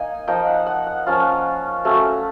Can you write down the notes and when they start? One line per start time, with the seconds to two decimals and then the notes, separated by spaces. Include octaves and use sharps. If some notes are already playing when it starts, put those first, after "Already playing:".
Already playing: A#3 D#4 G#5
0.27 F3 A#3 D#4 G5
0.47 F#5
0.67 F#5
0.87 F#5
1.06 F3 A#3 C#4 F4
1.85 F#3 A3 C#4